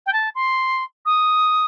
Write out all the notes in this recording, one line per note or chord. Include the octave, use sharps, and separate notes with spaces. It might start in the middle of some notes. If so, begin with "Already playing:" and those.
G5
A5
C6
D#6